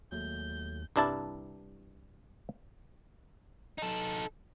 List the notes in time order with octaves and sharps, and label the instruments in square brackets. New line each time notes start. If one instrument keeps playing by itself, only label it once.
[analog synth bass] D#2 [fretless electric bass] F#3 G#3 A3 [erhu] G6
[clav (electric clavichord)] C2 G2 D4 E4 A5
[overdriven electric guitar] D#4 A4